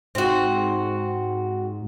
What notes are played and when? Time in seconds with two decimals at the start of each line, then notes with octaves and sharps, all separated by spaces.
0.15 G#2 C4 F#4